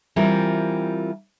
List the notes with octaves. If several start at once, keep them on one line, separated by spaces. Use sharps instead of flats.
E3 G3 C4 F4 A#4